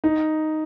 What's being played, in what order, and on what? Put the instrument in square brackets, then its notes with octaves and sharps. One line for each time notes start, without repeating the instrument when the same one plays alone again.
[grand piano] D#4